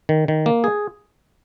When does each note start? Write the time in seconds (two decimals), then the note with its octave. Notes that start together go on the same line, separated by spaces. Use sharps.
0.09 D#3
0.28 D#3
0.46 A#3
0.64 G#4